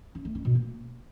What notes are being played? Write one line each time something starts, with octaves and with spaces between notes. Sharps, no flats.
C#4
A3
C#4
B2
A#3